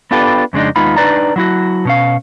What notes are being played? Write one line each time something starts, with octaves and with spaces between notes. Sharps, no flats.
B3 D4 F4 G4 A4 B4
F2 C#3 G#3 D4 D#4
D#2 G#3 B3 D#4 F4 B5
D4 D#4 B4 D5 A#5
F#3 E4 F#4
B2 C#4 F5